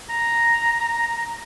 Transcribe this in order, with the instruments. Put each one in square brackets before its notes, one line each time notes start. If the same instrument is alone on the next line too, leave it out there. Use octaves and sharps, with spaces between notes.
[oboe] A#5